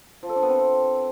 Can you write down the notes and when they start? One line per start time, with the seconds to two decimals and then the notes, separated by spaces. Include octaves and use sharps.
0.23 F3
0.29 A4
0.36 D4
0.42 B3
0.49 C4